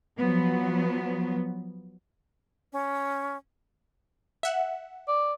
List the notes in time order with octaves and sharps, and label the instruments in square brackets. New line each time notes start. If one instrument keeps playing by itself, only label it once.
[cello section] F3 F#3 B3
[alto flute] C#4
[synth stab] E5 F#5
[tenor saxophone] D5